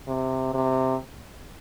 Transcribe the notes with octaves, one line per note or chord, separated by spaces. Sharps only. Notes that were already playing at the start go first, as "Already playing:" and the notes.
C3
C3